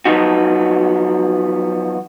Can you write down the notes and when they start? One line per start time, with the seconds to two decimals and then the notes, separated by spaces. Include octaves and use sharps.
0.06 F3 F#3 B3 D#4 F#4